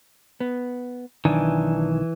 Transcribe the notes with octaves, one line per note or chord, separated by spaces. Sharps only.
B3
B1 D#3 E3 D4 G#5